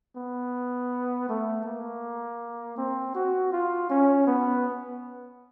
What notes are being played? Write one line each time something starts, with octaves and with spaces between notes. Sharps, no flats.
B3
A3
A#3
C4
F#4
F4
C#4
B3